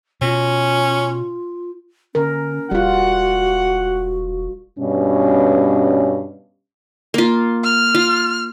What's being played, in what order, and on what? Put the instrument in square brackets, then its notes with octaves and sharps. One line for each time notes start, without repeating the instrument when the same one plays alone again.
[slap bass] B2 [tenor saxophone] C#4 [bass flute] F4
[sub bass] D3 [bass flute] C#4 [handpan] A#4
[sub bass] E1 [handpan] G3 F4 [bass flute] F#4 [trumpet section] F#5
[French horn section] G2 B2 C#4
[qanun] A#3 F4
[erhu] F6
[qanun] F4